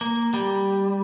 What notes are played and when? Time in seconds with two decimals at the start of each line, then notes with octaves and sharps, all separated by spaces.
0.01 A#3
0.34 G3